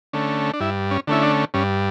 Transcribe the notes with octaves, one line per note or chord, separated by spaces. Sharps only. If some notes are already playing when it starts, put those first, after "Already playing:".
D3 A3 C#4
D4
G2 E4
C#4
D3 A3 C#4 E4
D4
G2 C#4